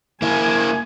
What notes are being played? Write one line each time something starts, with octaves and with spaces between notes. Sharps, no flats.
A#3 E4 G#5